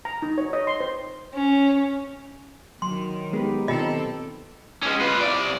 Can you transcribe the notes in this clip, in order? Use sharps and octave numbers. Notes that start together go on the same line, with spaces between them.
A#5
D#4
C#5
D#5
C6
C5
C#4
D#3 F#3 C6
G#3 B3 D#4 G4 B4
B2 D#3 C4 F4 A4 D#5 A#5
G#3 C#4
F4 B4
C2 D5